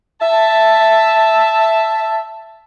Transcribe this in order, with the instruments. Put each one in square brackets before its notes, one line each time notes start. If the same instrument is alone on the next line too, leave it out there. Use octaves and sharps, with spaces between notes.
[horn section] E5 A5